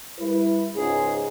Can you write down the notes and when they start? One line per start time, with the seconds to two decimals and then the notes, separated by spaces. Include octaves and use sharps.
0.20 G3 E4 B4
0.75 C#2 G#2 G#4